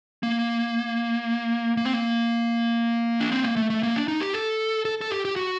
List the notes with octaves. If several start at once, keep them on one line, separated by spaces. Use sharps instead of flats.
A#3
A#3
C4
A#3
D4
C4
A#3
A3
A3
A#3
D4
D#4
G4
A4
A4
A4
G4
G4
F#4